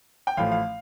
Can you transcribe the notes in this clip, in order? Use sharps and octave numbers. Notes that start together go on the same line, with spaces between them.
G5
A1 A2 F3 A3 F5
F5